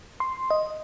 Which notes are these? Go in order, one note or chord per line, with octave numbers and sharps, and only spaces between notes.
C6
D#5